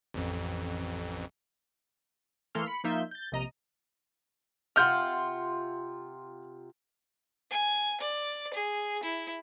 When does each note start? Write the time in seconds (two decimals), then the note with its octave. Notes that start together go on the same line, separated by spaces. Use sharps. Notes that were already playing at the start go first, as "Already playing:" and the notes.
0.14 A1 F2
2.55 E3 A3 A#3 A4 C6 F6
2.66 B5 C#7
2.84 F3 A#3 D#4 F4 E5 G6
3.11 G6 A6
3.32 A#1 C3 D#5 A#5 D#7
4.76 C3 F4 F#5 F6 G6
7.50 G#5
8.00 D5
8.54 G#4
9.03 E4